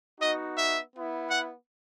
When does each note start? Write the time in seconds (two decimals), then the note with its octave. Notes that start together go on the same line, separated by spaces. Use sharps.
0.21 B3 D#4 F#4 D#5
0.58 E5
0.93 B3 E4
1.30 F#5